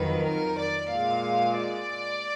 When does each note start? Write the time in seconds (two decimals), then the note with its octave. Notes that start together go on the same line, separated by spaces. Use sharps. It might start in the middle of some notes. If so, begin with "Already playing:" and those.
Already playing: F2 D#3 F#3 B4
0.24 A#4
0.58 D5
0.90 A#2 G#3 F5
1.56 D5